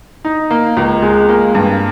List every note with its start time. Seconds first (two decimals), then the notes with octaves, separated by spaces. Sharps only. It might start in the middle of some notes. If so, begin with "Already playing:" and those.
0.25 D#4
0.51 A#3
0.77 C#2
1.02 G#3
1.29 A#3
1.55 G2